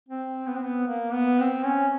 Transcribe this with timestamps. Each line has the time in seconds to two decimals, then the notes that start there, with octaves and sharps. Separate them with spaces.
0.08 C4
0.47 B3
0.55 C4
0.63 B3
0.87 A#3
1.13 B3
1.40 C4
1.65 C#4